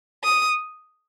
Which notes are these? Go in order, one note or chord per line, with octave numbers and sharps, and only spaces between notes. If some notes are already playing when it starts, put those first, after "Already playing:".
D#6